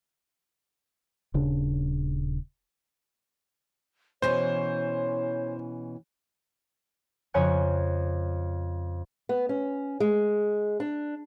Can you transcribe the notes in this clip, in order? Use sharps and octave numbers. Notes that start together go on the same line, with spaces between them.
D#1 C#3 D4
B2 E3 C#4 C5 C#5
F2 C#3 F4 C#5 G#5 F#6
B3
C#4
G#3
D4